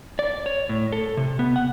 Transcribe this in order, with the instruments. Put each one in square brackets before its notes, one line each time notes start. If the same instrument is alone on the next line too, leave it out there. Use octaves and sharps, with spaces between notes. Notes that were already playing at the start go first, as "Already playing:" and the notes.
[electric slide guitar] D5
C#5
A2
A4
C3
B3
F#5